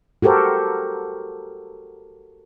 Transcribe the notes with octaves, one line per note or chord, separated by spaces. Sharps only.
F#4 G4 A4 A#4 C5